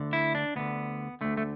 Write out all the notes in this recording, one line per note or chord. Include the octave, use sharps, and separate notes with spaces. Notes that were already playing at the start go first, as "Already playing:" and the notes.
Already playing: D2 D3
E4
D4
D2 D3 B3
D2 D3 A3
A3